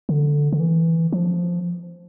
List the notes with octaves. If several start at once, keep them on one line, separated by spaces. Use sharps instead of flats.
D3
D3
E3
F3